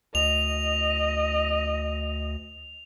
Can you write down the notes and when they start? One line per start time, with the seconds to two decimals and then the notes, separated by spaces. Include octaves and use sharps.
0.15 D2 D#5 F7